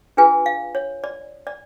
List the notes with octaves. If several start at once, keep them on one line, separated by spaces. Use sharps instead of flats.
D4 F4 G#4 B4 G#5
F5
C#5
D5
D5